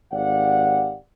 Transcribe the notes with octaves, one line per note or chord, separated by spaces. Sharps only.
G#1 G4 D5 F5 F#5